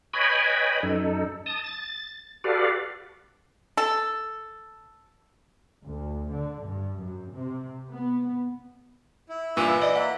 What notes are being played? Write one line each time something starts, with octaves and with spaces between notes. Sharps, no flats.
B4 C#5 D#5 G5 G#5 B5
F#2 D#4 A4
A5 D#6
A6
F#4 G4 A4 B4 D5 F5
A4
D2
D3
G2
F#2
C3
B3
E4
G2 A#2 E3 D#7
D5 D#5
A#3 E5 F#5